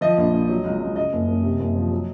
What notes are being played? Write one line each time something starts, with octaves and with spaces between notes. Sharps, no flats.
F3 D#5
A#1
A#1
F#3
C#2
C#2
C#3 D#5
F#1
F#1
C3
F#1
F3
F#3